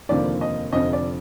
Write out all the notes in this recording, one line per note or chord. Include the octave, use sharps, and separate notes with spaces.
F1 D#2 D3 F3 A#3 D5
D#5
F1 F2 D3 F3 D#5
D5